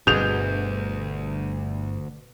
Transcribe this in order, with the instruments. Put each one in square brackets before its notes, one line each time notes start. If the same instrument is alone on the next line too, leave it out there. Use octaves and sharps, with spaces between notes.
[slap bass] G1 G2 [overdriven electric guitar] D2 [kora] B2 G#4 [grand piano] G6 F7